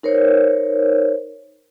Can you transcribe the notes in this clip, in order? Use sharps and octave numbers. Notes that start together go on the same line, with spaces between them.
D#4 A#4 C5 C#5